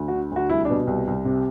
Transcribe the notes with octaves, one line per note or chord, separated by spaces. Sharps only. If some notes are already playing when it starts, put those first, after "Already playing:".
Already playing: D2
D3 F#4
D2 F#4
C2 E4
B2 D4
C2
C2
C3